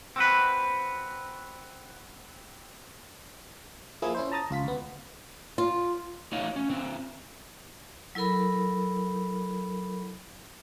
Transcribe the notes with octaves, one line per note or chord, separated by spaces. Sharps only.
C4 F#4 B4
F3 A#3 E4 G#4
C#4 E4 C5
A5 A#5 D#6 A6
C#2 F4 B6
D2 B3
F4
A3 D#4 F#4 C#5 F5
C#4
D3 C4
F#3 E4 A4 A#4 B5